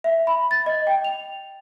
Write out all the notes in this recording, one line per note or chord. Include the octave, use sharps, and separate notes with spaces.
E5
B5
A6
D#5
G5
F7